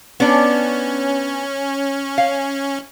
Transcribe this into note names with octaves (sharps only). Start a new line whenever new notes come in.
B3 C#4 D4
F5